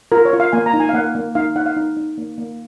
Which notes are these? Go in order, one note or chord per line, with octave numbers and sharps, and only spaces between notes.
F4 A#4
C#5
F4
F5
A#3 G#5
A#5
D#4
G#5
F5
A#3 F#5
A#3
D#4 F5
D#4 F#5
F5
D#4
D#4
A#3
A#3